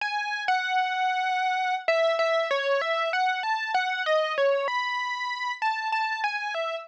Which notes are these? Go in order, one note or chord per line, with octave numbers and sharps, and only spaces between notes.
G#5
F#5
E5
E5
C#5
E5
F#5
A5
F#5
D#5
C#5
B5
A5
A5
G#5
E5